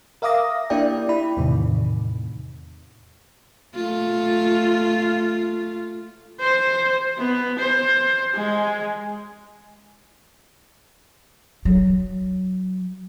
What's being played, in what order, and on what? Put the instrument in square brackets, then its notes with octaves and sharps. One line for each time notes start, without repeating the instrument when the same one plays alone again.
[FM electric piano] A#4 E5 F5 D6 D#6 A#6
A#3 D4 E4 G4 D5 G5
E4 B5
E2 A2 C3 D#3
[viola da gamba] A3 F4
[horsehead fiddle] C5
B3
C5
G#3
[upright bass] F#3